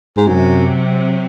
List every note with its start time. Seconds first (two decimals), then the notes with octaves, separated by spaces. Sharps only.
0.17 G#2
0.27 F#2 C3 F#3 C4